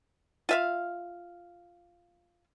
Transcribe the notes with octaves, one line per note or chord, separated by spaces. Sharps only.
F4 E5 F5